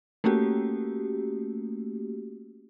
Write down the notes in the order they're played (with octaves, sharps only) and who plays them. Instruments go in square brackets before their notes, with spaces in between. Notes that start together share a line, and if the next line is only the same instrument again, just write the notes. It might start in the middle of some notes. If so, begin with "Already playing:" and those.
[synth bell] A3 A#3 C#4 F#4 G4